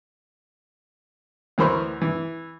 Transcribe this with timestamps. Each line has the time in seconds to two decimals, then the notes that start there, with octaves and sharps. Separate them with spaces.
1.58 D2 E3 A#4 C5 B5 C#6
2.01 E3